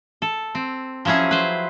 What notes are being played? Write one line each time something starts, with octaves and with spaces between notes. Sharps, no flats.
A4
C4
F3 F#3 C#4 E4 G#4
B4 C5